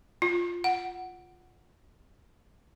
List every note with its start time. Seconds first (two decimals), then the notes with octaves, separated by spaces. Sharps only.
0.22 F4
0.64 F#5